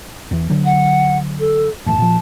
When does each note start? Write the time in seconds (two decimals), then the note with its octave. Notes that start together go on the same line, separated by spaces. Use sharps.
0.31 E2 E3
0.50 D3 F#3
0.65 F#5
1.39 A4
1.86 F#1 E2 A2 A5
1.98 A#2 F3